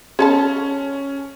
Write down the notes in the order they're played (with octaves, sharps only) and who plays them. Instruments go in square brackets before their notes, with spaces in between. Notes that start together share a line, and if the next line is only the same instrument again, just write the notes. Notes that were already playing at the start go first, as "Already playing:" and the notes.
[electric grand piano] C#4 [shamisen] G#4 A4 A5